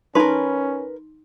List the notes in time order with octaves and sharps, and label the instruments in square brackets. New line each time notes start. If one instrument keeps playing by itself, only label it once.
[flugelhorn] C#4 [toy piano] D#4 C6 [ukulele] A#4 B4